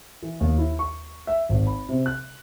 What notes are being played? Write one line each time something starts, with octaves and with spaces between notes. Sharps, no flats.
E3
D#2
E4
C#6
E5
G#1
B5
C3
F#6